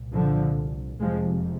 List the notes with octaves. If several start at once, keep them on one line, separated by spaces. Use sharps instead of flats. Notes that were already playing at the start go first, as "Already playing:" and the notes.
Already playing: C2 A#2
D3 F3
F1 F2 C3 F3 G#3